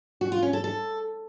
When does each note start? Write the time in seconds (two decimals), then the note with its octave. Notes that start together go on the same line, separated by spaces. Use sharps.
0.21 F#4
0.32 F4
0.42 C#4
0.53 A4
0.64 A4